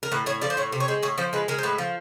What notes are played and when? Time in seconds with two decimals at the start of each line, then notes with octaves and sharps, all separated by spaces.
0.03 A#4
0.12 A2 B4
0.26 A2 C#5
0.42 F3 D5
0.50 C5
0.57 A2 C#5
0.72 C3
0.80 C#5
0.88 G#3 C5
1.02 A2 C#5
1.18 F3 C5
1.33 G#3 B4
1.48 G#3 A#4
1.58 C5
1.63 A2 B4
1.78 F3